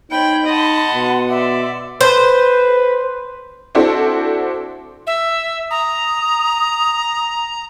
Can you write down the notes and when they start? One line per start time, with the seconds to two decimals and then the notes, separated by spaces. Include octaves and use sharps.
0.11 D#4 C5 C#5 D#5 G5 B5
0.46 D#5 F#5 A5 C6
0.94 B2
1.29 D5 E5
2.01 B4 C5
3.75 C4 D4 E4 F#4 A4 C5
5.07 E5
5.71 A#5 D#6